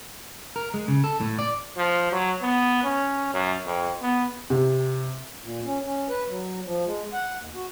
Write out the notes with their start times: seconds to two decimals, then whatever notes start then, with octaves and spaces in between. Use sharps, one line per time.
0.56 A#4
0.74 G#3
0.88 C#3
1.04 A4
1.21 A2
1.39 D5
1.77 F3
2.12 F#3
2.42 B3
2.84 C#4
3.34 F#2
3.66 F2
4.02 B3
4.50 C3
5.43 A#2
5.65 C#4
5.85 C#4
6.09 B4
6.28 F#3
6.65 F3
6.86 G#3
7.13 F#5
7.38 D#2
7.54 F#4